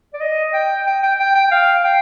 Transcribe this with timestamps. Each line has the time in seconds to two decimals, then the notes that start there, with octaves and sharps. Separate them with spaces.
0.14 D5
0.21 D#5
0.54 G5
0.86 G5
1.03 G5
1.20 G5
1.35 G5
1.51 F5
1.85 G5